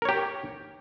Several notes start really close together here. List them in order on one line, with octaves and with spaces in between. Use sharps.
A#4 C#5 G4